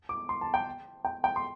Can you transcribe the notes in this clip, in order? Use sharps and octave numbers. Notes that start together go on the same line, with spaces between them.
D6
C6
A5
G5
G5
G5
C6